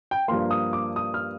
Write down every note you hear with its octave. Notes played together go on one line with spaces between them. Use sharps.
G5
G2 F3 A#3 C6
D#6
D6
D#6
F6